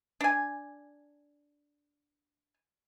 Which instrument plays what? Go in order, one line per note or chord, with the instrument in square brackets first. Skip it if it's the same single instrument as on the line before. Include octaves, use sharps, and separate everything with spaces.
[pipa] D4 G#5